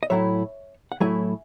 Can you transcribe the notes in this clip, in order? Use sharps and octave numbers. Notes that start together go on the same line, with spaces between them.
D#5
A2 F#3 A3 E4 C#5 E5
F#5
A2 F#3 A3 E4 E5 G#5